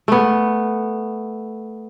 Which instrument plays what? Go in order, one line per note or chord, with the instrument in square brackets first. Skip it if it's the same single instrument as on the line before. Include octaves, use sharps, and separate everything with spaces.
[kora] A3 B3